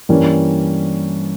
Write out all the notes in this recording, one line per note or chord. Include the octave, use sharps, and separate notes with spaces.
G2 E3 G3 A#3 C#4